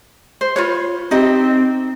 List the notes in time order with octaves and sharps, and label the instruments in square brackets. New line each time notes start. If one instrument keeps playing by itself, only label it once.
[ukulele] C5
F4 B4 C#5
[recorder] C4 [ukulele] D#4 G4 D#5